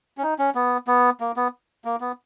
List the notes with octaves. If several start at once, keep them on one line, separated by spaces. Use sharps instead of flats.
C#4
D#4
C#4
B3
B3
A#3
B3
A#3
B3